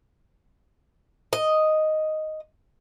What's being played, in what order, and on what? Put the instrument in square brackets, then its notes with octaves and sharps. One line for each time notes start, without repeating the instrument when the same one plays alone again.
[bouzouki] D#5